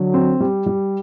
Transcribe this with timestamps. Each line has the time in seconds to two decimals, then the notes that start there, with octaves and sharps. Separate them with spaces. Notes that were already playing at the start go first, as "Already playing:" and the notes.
Already playing: D3 F#3
0.14 C4
0.40 G3
0.66 G3